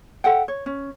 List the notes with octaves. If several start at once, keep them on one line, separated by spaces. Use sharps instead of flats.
A4 E5 F#5 G5
C#5
C#4